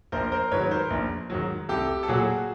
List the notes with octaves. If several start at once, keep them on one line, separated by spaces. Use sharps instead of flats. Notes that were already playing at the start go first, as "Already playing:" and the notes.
A#1 A#4 C5
A#4 C5
G#2 D#3 F#3 B4 C#5
A#4 C5
A#1
G#2 D#3 F#3
C2 G4 A4
A4
A#2 F#3 F#4 G#4